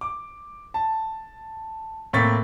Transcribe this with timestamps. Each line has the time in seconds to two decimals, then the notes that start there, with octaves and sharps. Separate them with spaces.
0.01 D6
0.74 A5
2.13 A2 A#3 C4 C#6 A6 B6